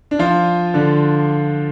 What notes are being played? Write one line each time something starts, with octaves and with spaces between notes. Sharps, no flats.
D4
F3 F4
D3 D4